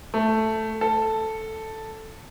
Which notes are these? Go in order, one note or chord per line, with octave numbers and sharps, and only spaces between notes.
A3
A4